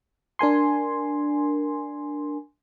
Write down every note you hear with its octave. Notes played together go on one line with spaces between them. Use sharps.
D4 A#4 G#5 C6